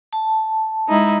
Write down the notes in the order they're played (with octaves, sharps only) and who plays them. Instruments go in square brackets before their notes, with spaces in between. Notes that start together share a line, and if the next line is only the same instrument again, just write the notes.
[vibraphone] A5
[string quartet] G#3 D#4 E4